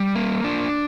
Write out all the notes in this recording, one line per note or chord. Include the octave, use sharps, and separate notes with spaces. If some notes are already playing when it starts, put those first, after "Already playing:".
Already playing: G3
A#3
D4